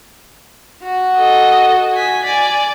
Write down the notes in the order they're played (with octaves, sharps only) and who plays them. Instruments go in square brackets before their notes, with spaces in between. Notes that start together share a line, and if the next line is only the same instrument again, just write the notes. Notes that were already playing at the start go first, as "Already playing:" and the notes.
[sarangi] F#4
[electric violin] A4 D#5
G#5 B6
[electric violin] D5 [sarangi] G#5